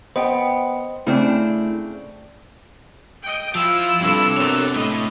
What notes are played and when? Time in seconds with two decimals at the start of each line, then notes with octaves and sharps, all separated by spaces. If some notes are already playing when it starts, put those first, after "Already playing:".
0.16 B3 C5 D#5 G5
1.07 C#3 A3 C4 D4 E4 A4
3.23 D#5 G5
3.55 F3 E4 F4 E6
4.00 G2 C3 D4 A4
4.37 B3 C4 A#4 C#5
4.76 A2 A3 D#5